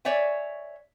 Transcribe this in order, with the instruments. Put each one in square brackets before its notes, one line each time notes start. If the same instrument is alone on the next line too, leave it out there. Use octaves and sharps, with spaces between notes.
[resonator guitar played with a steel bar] C#5 D5 E5 G#5